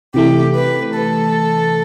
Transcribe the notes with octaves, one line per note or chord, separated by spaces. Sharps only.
C3 E3 A3 G4
B4
A4